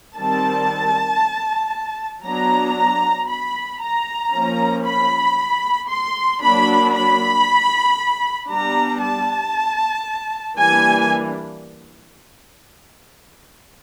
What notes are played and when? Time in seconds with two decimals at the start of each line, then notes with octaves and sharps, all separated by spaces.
0.17 D#3 G3 C4 A5
2.25 F#3 B3 D4 A#5
3.29 B5
3.81 A#5
4.33 F3 A#3 C#4
4.85 B5
5.89 C6
6.41 F#3 A#3 D4 B5
6.93 B5
8.49 G3 B3 D4 A#5
9.01 A5
10.57 E3 G3 A#3 D4 G#5